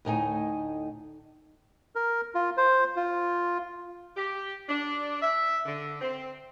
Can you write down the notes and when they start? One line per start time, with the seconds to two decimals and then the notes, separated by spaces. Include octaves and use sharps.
0.05 D2 A2 D#4 G#5
1.95 A#4
2.35 F4
2.57 C5
2.96 F4
4.16 G4
4.68 D4
5.22 E5
5.66 D3
6.01 C4